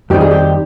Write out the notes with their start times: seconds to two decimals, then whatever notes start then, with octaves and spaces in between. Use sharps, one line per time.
0.10 F2 D#3 G3 C4 D#4 G4
0.21 G#4
0.31 G4